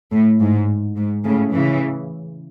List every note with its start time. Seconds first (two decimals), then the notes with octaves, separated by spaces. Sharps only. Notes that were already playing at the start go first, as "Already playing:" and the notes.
0.12 A2
0.40 G#2
0.97 G#2
1.25 A2 C#3
1.53 C#3 E3